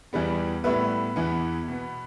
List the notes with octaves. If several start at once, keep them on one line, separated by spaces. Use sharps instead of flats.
E2 E3 G3 B3
A2 G3 B3 B4 E5
E2 E3 B3
B2 B3